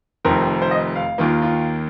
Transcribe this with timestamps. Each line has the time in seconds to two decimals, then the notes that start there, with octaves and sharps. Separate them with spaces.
0.25 F1 F2 D#3 C4 A#4
0.62 C5
0.71 D#5
0.96 F5
1.18 D#2 D#3 A#3 F4
1.42 F4